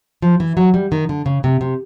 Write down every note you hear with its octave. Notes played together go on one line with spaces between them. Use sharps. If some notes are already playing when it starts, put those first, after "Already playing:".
F3
E3
F#3
G3
D#3
D3
C#3
C3
C3